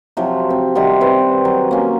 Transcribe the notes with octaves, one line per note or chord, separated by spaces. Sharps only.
C3 F3 F#3
C4
C3 D#3 G3 F#5
C4 B4 C5
F#3
A#3 C#4